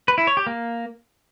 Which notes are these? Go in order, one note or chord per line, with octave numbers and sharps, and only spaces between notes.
B4
E4
C#5
G4
A#3